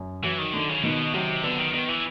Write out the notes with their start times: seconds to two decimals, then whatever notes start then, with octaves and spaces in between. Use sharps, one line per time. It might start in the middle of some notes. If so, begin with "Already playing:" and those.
Already playing: F#2
0.23 E3 F#3
0.38 D#3
0.53 D3 D#3
0.69 C#3
0.83 B2 D#3
1.13 C3 F#3
1.43 D3 B3
1.59 D#3
1.73 D#3 B3
1.89 E3